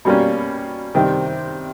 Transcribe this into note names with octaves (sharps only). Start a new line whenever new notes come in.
B2 G3 A#3 C#4
C3 D#3 G3 C4